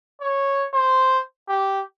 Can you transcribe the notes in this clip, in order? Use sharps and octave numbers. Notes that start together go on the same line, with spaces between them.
C#5
C5
G4